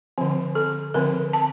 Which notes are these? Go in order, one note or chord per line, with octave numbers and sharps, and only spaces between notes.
D3 F3 C4
A4
D3 F3 C4 A#4
A5